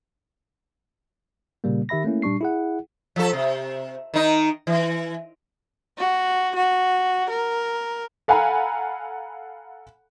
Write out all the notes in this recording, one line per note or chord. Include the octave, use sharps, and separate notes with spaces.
A#2 C#3 G3 A#3
D#3 G4 E5 B5 A#6
A3 A#3 C#4 E4
A#2 G3 D4 C#6 C7
E4 G#4 F#5
F3 A4
C3
D#3 D#4
E3
F#4
F#4
A#4
A4 F5 F#5 G#5 A#5 B5